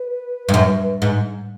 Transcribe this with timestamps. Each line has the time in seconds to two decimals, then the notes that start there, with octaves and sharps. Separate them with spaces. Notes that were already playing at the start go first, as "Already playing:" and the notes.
Already playing: B4
0.49 G2
0.54 F#2
1.02 G#2